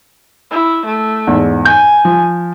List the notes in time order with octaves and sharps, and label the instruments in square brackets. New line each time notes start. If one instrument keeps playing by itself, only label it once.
[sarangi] E4
A3
[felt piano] E2 G#2
[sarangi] G#5 [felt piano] G6
[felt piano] F3